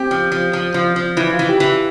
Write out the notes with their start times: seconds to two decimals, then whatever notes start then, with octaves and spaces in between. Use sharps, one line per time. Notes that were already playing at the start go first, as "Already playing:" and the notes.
Already playing: C4 G4
0.11 F3
0.32 F3
0.53 F3
0.74 F3
0.96 F3
1.17 E3 E4
1.33 F4
1.39 E3
1.49 G4
1.60 E3